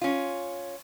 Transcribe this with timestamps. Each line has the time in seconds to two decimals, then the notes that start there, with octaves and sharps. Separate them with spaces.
0.01 C#4 F4